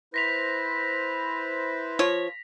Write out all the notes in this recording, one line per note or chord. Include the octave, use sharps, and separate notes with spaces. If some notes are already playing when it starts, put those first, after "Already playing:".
E4 B4 C5 A#6 B6 F7
F3 F4 C#5